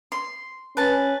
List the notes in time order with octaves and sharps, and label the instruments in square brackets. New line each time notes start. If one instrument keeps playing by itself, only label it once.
[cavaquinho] C6
[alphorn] C#4 [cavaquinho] B4 A5